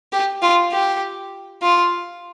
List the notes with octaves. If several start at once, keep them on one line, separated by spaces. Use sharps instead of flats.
G4
F4
G4
F4